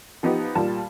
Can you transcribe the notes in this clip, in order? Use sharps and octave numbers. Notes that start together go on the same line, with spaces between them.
F3 B3 D#4 G4
A#2 G3 A5